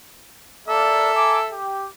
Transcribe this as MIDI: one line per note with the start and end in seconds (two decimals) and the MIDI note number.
0.68 1.10 58
0.68 1.55 69
0.68 1.10 74
0.68 1.55 76
1.14 1.40 80
1.14 1.40 82
1.14 1.40 86
1.51 1.86 67